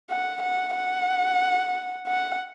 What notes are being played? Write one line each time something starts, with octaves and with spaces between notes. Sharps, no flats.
F#5
F#5
F#5
F#5